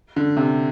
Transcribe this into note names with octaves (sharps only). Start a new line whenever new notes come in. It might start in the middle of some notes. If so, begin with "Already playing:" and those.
D3
C3